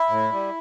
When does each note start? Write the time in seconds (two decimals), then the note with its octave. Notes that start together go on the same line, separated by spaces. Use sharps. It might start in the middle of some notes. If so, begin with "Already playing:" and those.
Already playing: E4
0.09 A2
0.32 G3